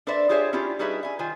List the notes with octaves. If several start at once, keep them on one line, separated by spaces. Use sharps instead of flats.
D4 A4 B4 C5 D5 E5
F4 G4 G#4 C5 C#5 E5
C#4 D4 E4 F4 G4
G3 D#4 F#4 G#4 B4 E5
E5 G#5
D#3 F4 C5 G#5